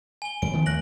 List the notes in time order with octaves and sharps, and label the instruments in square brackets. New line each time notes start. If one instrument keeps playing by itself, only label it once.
[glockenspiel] G#5 G7
[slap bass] F2 [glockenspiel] D7
[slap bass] D#3 F3 B3
[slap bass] D#2 A3 A#3 [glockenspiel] F#6 A#6 F#7